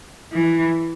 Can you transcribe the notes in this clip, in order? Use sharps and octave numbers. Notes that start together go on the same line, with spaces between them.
E3